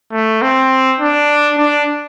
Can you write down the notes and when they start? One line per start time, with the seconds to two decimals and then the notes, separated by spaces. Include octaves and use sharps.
0.12 A3
0.42 C4
1.00 D4
1.58 D4